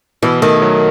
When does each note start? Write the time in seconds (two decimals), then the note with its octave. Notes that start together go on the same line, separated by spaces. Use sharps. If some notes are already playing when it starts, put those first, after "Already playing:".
0.23 B2 E3
0.42 D#3 A3
0.62 F#3